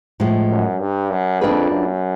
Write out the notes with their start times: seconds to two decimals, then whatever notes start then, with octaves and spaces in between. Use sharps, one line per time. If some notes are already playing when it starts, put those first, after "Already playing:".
0.20 A2 F3 G#3
0.49 F#2
0.80 G2
1.11 F#2
1.41 F2 A#3 D4 F4 G#4 B4
1.71 F#2